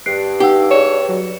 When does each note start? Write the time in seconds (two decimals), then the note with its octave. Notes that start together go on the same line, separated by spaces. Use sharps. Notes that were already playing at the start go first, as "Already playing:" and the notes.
0.06 G2 F#6 C7 D7
0.40 D#4 G4 F#5 E6
0.71 G#4 C#5 D5 E7
1.09 F#3